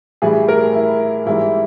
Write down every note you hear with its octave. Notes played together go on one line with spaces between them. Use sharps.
A2 E3 G3 G#4
A#4
E4
G#2 E3 G3 E4